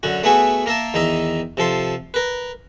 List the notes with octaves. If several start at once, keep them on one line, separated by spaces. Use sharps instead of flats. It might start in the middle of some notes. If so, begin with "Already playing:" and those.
F#2 D3 F#4
A3 B3 F#4 G#4 E5
A#3 A#4 E5 A5
E2 D#3 D#4 E5
C3 F3 A4 C6
A#4 B4